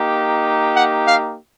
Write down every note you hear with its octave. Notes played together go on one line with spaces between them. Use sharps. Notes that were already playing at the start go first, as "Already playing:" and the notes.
Already playing: A#3 D#4 G4
F#5
F5